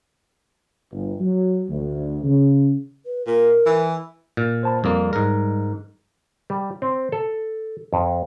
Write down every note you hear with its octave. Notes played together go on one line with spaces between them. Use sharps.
G1
F#3
D2
C#3
B4
A#2 A#4
E3
A#2
C5 A5 B5
F2 G3 A#3
G#2 A#4
G3
C4
A4
F2